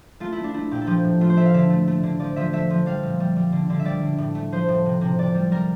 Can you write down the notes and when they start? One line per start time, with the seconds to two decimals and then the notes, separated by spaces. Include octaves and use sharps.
0.20 A3 F4
0.32 A3 E4
0.44 D4
0.54 A3 E4
0.71 A#2 G4
0.81 A4
0.87 F3 G4
1.05 A2
1.21 A3 F4
1.30 C5
1.36 A3 E5
1.46 F5
1.54 D3 E5
1.70 A3
1.87 A3
2.03 D3
2.19 F3 D5
2.36 F3 E5
2.53 A3 E5
2.70 F3
2.86 G3 F5
3.03 A#2
3.20 G3
3.36 G3
3.52 D3
3.70 D3
3.80 E5
3.85 G3 D5
4.02 D3
4.18 A2
4.35 A3
4.52 F3 C5
4.69 A2
4.86 C3
5.01 C3
5.19 C3 D5
5.35 G3
5.51 G3 A#4